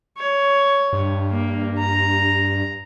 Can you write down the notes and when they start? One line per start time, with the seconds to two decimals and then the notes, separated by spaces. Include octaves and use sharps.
0.18 C#5
0.93 G2
1.31 A#3
1.78 A#5